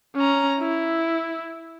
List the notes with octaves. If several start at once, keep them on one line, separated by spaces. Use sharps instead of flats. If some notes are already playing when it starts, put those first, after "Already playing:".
C#4 A#5
E4